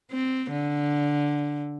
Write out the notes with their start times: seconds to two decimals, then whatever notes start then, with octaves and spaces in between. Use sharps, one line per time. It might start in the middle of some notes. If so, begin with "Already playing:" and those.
0.12 C4
0.51 D3